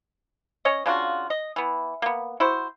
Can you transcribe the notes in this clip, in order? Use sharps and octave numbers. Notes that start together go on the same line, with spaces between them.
C#4 C#5 D#5
C#3 D4 F4 F#4
D#5
E3 B3
A#3 B3
E4 F#4 C5